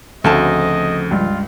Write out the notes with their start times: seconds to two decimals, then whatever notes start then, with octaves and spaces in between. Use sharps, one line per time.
0.24 D2 C#3 F3 A3 C4 F#4 D#5 A5
1.11 C#2 G2 F4